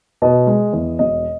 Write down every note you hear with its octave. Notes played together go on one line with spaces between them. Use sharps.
B2 D#5
G#3
E2
E1 D#5